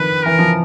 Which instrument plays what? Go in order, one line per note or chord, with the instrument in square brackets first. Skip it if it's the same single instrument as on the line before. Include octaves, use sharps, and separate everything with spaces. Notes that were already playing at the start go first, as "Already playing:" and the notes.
Already playing: [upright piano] D#3 F3 [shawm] B4
[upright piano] E3 [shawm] A#4
[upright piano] F3